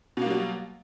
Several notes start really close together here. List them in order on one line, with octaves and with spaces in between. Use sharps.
B2 A#3 G3 F#3